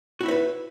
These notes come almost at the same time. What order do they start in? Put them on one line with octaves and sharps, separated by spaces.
F#4 E4 E5 C5 B4